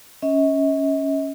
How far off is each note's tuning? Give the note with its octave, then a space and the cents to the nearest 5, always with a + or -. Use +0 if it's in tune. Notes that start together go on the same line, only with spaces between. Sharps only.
C#4 +0 D#5 +45